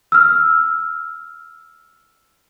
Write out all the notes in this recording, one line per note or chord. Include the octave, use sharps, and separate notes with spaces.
E6 F6